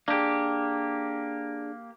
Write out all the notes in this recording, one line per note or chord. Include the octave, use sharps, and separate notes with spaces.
A#3 D4 G4 G#4